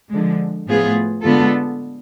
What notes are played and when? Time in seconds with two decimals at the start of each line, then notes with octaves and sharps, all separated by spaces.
0.10 D3 F3 G#3
0.67 A2 F3 B3 F4 G#4
1.23 D3 G#3 B3 F4 A4